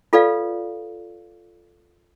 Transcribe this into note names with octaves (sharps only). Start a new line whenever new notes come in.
F4 A4 B4 D5 F5